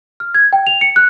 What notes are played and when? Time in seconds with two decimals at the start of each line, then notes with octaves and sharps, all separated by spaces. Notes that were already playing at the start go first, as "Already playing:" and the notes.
0.20 F6
0.34 G#6
0.53 G5
0.67 F7
0.81 C#7
0.96 F#6